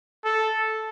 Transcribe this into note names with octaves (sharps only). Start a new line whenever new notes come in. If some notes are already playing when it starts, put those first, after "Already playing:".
A4